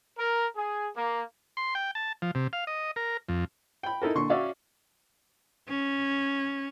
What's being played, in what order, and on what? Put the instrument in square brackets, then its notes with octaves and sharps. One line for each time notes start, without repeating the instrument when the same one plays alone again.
[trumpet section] A#4
G#4
A#3
[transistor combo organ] C6
G5
A5
F3
C3
F5
D#5
A#4
F2
[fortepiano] G5 B5
D#4 E4 A4 A#4
A#2 D3 C6 C#6
C#4 F#4 C#5 D5 E5 F5
[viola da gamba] C#4